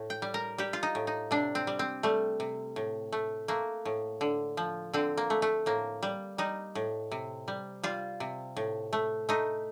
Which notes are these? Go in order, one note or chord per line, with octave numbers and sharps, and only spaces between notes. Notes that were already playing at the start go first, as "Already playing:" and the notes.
Already playing: A2
G5
G3
A#4
G3 G4
F4
D#4
A2
D#4
C3 D4
C4
G3
C4
G3 A3
C3
A2
A3
A3 A#3
A2
D3
F3
D3 C4
A#3
A3
A3
A2 A#3
G3
G3 D#4
A2
C3
G3
G3 F4
C3
A2
A3
A3 D#4